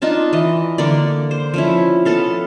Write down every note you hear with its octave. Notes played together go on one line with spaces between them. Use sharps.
D4 D#4 F4 A5
E3 D#5
D3 A#3 D5
C5
F3 C#4 E4
B3 A4 F5